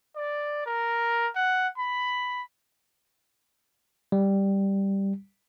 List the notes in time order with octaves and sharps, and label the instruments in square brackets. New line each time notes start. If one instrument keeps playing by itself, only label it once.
[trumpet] D5
A#4
F#5
B5
[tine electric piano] G3